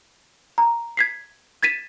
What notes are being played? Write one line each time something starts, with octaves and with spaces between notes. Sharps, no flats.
A#5
G#6 B6 C7
G#6 A6 B6 D#7 E7